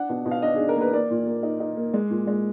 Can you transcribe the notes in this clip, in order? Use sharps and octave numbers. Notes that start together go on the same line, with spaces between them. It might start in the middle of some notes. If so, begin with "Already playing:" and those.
Already playing: D4 F#5
B2
B2
F5
D4 D#5
D4 G#4
A#4
A#3 B4
A#3 D5
A#2
A#3
D#4
D#4
A#3
G#3
A#2
G#3